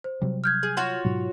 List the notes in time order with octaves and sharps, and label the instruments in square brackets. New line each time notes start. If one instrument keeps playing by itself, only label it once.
[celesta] C5
[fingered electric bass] C3 F#3 G3
[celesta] F6 G6 G#6
[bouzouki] G#4
F4 F#4 C#5
[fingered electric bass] G#2 B2 F#3